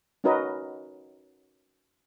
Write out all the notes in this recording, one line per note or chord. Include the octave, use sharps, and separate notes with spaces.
C#4 D#4 F#4 A#4 B4 D#5